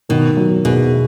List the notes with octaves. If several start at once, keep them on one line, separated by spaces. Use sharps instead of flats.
B2 D#3
F#3
E2 B2